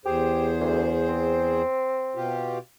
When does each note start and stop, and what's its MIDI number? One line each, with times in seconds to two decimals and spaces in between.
0.06 1.62 40
0.06 0.50 67
0.06 1.62 68
0.06 1.62 72
0.60 0.90 38
1.08 2.42 60
2.16 2.58 47
2.16 2.58 65
2.16 2.58 67